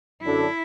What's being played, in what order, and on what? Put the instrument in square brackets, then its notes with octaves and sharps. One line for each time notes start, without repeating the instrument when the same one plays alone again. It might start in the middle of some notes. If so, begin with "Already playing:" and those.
[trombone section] F#2 D3 F#3 D4 A4 [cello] E4